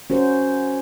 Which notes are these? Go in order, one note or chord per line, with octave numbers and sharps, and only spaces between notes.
C#4 F#4 A#4 C5